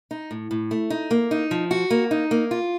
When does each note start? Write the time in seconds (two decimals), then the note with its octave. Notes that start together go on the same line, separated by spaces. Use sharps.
0.11 D#4
0.31 A2
0.51 A2
0.71 A3
0.90 D#4
1.11 A#3
1.31 D#4
1.51 F3
1.71 F#4
1.90 A#3
2.11 D#4
2.31 A#3
2.51 F4